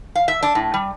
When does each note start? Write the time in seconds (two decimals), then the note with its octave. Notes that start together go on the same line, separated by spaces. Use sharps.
0.15 F5
0.28 E5
0.43 D4
0.55 A2
0.74 G3